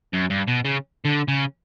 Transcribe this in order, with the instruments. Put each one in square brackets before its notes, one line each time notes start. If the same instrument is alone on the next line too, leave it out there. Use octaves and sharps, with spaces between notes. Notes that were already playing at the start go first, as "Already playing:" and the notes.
[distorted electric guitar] F#2
G2
B2
C#3
D3
C#3